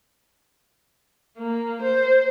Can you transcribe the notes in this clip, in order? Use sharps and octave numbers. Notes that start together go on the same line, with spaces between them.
A#3
C5